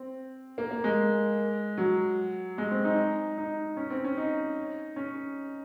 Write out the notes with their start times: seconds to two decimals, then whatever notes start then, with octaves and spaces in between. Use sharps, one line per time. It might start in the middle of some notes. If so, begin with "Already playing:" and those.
Already playing: C4
0.58 A#3
0.71 A#3
0.84 G#3
1.78 F#3
2.58 G#3
2.71 C4
2.84 D#4
3.38 D#4
3.77 C#4
3.90 C4
4.04 C#4
4.17 D#4
4.96 C#4